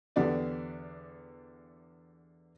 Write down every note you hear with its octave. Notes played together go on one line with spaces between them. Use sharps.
E2 D3 B3 D4 G4 D5